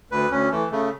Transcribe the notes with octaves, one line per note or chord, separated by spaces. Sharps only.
D2 B4
D2 C#4
E3 A3
C#3 A3